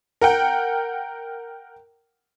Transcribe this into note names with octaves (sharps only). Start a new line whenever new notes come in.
A#4 F#5 G5